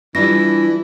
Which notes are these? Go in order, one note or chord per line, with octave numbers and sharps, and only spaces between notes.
E3 G3 D4 E4 F4 A#6